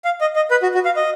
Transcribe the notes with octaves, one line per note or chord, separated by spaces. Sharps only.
F5
D#5
D#5
B4
F#4
F#4
F5
D#5